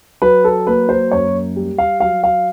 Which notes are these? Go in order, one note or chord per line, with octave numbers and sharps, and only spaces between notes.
F#3 B4
A4
A#3 B4
C5
F#2 C#5
G3
F5
F#3 F5
F5